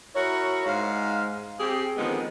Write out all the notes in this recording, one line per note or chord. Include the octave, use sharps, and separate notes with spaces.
E4 F#4 A#4 C#5
G#2 G#3 C5 F5
C4 G4 G#4
D3 D#3 F3 G#3 B3 C4